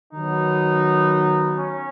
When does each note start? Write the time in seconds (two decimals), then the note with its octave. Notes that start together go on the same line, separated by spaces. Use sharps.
0.14 D#3 F#3 B3 D#4
1.57 C#4